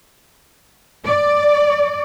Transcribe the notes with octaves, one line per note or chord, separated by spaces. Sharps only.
D5